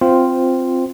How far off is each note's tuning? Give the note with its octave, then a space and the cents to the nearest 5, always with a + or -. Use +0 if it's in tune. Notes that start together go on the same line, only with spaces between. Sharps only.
C4 +0 F4 +0 C5 -10